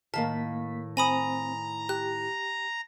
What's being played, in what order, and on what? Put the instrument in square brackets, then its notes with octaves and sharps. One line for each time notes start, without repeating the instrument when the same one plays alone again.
[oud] A2 D#3 F5 [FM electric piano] A#3 B6 [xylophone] A5
[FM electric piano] C4 C5 [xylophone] G#5 B5 D#6 [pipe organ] A#5
[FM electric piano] G4 [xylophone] F#6